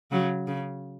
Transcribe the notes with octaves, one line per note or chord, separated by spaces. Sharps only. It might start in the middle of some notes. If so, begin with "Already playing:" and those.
C#3 F#3
C#3